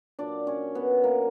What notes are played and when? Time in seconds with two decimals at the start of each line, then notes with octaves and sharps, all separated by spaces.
0.19 A#2 F#3 D4 D5
0.47 C#4 C#5
0.75 B3 B4
1.04 A#3 A#4